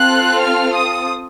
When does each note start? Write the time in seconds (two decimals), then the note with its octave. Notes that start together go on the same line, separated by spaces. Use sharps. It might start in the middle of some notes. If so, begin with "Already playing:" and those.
Already playing: C4 F4 A4 F#6
0.42 F6
0.75 D#6